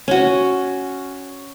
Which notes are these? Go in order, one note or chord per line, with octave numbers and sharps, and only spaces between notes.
C#4 F#4